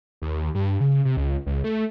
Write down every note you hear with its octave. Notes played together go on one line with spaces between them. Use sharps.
D#2
G2
C#3
C3
C#2
C#2
A3